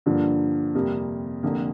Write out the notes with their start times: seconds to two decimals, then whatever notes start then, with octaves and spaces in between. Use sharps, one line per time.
0.06 G2 D3 F3 A#3 D4
0.75 F2 C3 G3 A#3
1.43 F1 F2 D3 A#3